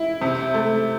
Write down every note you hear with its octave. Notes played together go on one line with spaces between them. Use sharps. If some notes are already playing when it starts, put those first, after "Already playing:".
Already playing: E4
C3
A3